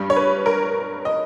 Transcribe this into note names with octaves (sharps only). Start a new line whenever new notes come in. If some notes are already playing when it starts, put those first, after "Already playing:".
Already playing: G2 G3
C#5
B4
A#4
D#5